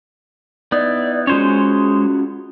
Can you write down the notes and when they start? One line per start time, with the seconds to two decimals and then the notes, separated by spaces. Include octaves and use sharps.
0.72 B3 D#4 E4 D5
1.27 G#3 C#4 F4 F#4 C5 C#5